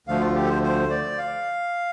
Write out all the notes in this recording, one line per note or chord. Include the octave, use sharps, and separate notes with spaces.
D2 D3 F3 A3 F5
F4
G4
A4
C5
C5
D5
F5